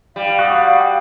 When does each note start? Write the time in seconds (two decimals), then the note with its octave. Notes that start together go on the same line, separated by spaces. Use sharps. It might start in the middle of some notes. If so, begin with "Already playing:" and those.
0.16 G3 F5
0.39 F#4 F#5 D#6